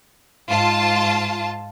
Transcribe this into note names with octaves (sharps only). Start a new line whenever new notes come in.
G#2 F4 A5